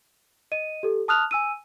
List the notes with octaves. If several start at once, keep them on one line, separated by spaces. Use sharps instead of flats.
D#5 D#7
G4 A4
A5 D#6 F6 F#6 F7
G#5 E6 D#7